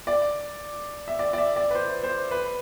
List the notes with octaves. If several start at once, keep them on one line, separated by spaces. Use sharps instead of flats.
D5
E5
D5
D5
E5
D5
B4
C5
C5
B4